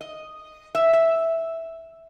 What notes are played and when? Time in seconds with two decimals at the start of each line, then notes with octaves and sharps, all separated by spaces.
0.01 D#5
0.75 E5
0.93 E5